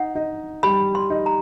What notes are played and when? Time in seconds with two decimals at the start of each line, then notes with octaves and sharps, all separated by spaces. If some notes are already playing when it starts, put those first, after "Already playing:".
Already playing: D#4 F#5
0.15 D#4
0.63 G3 B5
0.95 C6
1.10 D#4
1.26 A#5